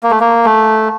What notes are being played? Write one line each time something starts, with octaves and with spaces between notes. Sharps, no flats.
A#3
A3
A#3
A3